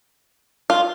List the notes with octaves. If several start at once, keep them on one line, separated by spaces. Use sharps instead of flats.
F4